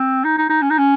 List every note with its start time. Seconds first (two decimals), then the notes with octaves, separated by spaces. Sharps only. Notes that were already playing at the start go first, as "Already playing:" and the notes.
Already playing: C4
0.24 D#4
0.38 D#4
0.50 D#4
0.62 C#4
0.70 D#4
0.79 C#4